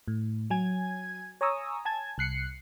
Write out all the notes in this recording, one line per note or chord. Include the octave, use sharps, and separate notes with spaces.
A2
F#3 G#5 G#6
C#5 G#5 A#5 C#6 D#6 E6
G#5 A5 G#6
C2 F#6 C7 C#7